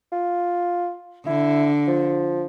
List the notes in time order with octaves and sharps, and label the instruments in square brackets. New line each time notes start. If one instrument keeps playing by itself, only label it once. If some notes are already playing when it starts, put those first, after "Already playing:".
[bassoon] F4
[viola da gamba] D3 [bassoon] E4
[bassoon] F3